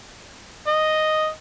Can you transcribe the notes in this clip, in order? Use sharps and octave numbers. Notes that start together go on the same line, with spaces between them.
D#5